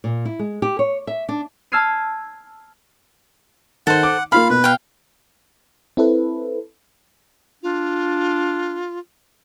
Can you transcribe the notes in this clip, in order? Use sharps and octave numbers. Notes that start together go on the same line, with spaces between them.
A#2
E4
G#3
G4
C#5
E5
D4
A5 E6 F6 G#6 C7 D#7
D#3 A4 C5 F#5
D6
A#3 F4 F5 B5 F6
B2 B4
F5 G5
C4 E4 A4 B4
D4 F4